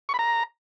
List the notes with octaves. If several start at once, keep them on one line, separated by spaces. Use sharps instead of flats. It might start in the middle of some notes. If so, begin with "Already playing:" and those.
C#6
B5
A#5